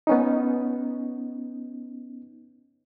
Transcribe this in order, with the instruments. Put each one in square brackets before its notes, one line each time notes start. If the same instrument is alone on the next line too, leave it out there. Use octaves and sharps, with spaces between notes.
[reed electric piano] B3 C#4 D#4